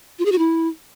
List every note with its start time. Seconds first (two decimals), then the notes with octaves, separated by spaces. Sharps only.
0.19 F4
0.25 G#4
0.32 F#4
0.38 E4